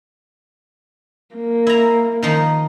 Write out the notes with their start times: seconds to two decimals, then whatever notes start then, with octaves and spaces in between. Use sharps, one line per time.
1.35 A#3
1.67 E4 A#5
2.23 D#3 F3 D#4